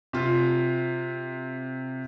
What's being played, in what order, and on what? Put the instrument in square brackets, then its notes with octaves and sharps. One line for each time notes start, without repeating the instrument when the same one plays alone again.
[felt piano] C3 F4